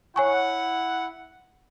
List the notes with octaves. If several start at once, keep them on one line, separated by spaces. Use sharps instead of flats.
E4 C#5 F#5 G#5 C#6